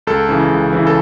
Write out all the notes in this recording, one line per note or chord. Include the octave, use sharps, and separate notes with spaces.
C#2 A4
C#3 E3
C#2
C#3 E3
A4